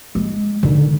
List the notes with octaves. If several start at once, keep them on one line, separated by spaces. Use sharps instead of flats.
G#3
D3 D#3